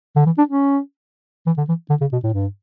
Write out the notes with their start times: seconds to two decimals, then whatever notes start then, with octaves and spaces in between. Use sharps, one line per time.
0.16 D3
0.26 E3
0.38 D4
0.49 C#4
1.46 E3
1.58 D3
1.68 E3
1.90 D3
2.01 C#3
2.12 B2
2.23 A2
2.33 G2